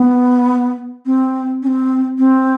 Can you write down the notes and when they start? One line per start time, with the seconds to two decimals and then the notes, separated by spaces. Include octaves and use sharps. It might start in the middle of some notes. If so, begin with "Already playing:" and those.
Already playing: B3
1.06 C4
1.62 C#4
1.67 C4
2.18 C4